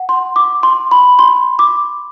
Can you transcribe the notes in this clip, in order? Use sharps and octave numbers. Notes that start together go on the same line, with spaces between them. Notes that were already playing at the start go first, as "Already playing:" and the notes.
Already playing: F#5
C6
D6
C6
B5
C6
D6